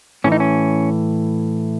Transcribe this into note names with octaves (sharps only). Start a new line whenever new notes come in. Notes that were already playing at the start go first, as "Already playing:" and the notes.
A2 E3 C#4
D#4
C#4